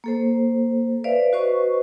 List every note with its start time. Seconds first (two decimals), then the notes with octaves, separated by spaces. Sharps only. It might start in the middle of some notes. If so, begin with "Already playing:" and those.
0.04 A#3 A4 C5
1.04 B4 C5 D5 E5 F5
1.33 F#4 B4 C5 D#5 C#6